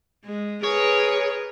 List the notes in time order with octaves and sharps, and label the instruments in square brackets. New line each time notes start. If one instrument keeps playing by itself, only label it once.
[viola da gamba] G#3
[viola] G#4 [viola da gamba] A#4 B4 [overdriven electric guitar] C#5